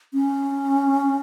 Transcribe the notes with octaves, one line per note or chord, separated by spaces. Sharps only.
C#4